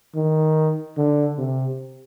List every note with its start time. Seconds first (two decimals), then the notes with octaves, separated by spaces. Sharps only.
0.16 D#3
0.98 D3
1.38 C3